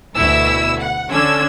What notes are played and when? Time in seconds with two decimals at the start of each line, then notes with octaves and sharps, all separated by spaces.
0.17 D2 B2 E4 E6
0.81 F#5
1.11 D3 C#4 D4 E6 G#6